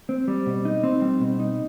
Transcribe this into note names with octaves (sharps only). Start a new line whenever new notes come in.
C4
G3
B2
D#4
C4
G3
B2
D#4